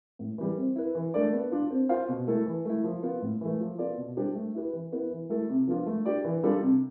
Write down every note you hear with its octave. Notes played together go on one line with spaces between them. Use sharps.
A2
E3 G3
C4
E4 B4
E3
A3 D4 A4 D5
B3
D4 F4
C4
F4 C5 F5
B2
A3 E4 A4
E3
A3 E4
F3
B3 F4
A2
E3 A3
F3
B3 F4 A4 D5
B2
G3 D4 G4 C5
A3
E4 G4 B4
E3
B3 E4 B4
E3
A3 E4 A4
C3
F3 B3 D4 F4
A3
D4 G4 D5
E3
G3 D4 F4 A4
C3